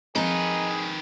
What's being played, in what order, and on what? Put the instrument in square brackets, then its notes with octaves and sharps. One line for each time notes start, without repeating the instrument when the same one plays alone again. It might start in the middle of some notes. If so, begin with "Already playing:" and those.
[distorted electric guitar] D#3 B4 [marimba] F3 C4 [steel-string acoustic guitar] D#4 [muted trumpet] G#4